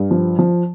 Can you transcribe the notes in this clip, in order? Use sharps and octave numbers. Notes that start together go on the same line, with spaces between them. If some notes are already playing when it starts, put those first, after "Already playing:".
Already playing: G2
F3
F3